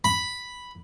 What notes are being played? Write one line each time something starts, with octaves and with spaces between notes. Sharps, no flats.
B5